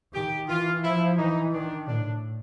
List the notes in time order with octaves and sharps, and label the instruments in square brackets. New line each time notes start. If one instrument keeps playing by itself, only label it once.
[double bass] D#3 [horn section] G4
[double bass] E3 [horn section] F4
[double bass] F3 [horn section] E4
[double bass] E3 [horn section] D#4
[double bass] D#3 [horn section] D4
[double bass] A2 [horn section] D4